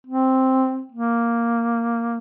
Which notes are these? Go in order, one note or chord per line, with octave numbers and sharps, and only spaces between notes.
C4
A#3